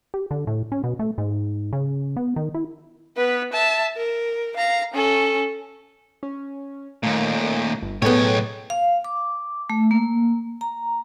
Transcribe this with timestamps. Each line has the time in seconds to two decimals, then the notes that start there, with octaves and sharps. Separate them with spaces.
0.14 G4
0.31 D3
0.47 A2
0.72 C#4
0.84 B2
0.99 A3
1.18 G#2
1.73 C#3
2.17 B3
2.36 D#3
2.54 E4
3.17 B3 B4
3.53 E5 A5
3.97 A#4
4.57 F5 A#5
4.94 C#4 A4
6.23 C#4
7.03 D#2 A#2 A3
7.82 G1
8.02 B1 A2 B3 G#4 A4 C#5 G5
8.70 F5
9.04 D6
9.70 A3
9.91 A#3
10.61 A#5